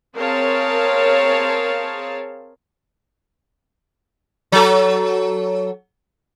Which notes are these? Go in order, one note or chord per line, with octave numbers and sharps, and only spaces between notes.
C4 G#4 A#4 C#5 F5 A5
F#3 A4